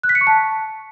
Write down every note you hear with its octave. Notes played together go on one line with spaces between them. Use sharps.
F#6
B6
C#7
C#6
A5